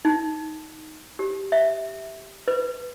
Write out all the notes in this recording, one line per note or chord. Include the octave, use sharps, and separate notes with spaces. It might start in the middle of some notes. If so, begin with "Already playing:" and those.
D#4
G4
E5
B4